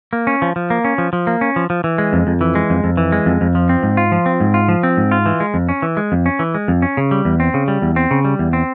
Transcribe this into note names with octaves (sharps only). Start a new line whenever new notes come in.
A#3
C#4
F3
F3
A#3
C#4
F3
F3
A#3
C#4
F3
F3
E3
G#3
F2
F2
E3
G#3
F2
F2
E3
G#3
F2
F2
F3
C4
G#2
F4
F3
C4
G#2
F4
F3
C4
G#2
F4
E3
G#3
F2
C#4
E3
G#3
F2
C#4
E3
G#3
F2
C#4
C#3
G3
E2
C4
C#3
G3
E2
C4
C#3
G3
E2
C4